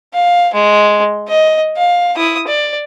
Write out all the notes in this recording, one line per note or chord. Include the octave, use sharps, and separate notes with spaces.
F5
G#3
D#5
F5
E4 D#6
D5